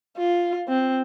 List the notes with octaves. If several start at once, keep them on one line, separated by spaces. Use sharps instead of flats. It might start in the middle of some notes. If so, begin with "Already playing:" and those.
F4
C4